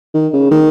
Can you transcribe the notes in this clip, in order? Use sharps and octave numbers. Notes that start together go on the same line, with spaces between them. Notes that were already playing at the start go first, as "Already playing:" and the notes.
D#3
C#3
D#3